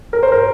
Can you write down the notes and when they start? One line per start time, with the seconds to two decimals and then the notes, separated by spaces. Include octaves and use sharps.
0.13 A#4
0.23 C5
0.32 A#4